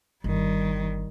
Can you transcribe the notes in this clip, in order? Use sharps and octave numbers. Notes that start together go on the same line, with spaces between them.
G1 D#3 G3